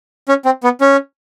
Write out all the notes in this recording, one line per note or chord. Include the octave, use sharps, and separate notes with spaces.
C#4
C4
B3
C#4